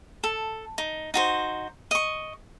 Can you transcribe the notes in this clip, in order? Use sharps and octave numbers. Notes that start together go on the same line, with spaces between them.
A4
D#4
D#4 F#4 C5
D#5 C#6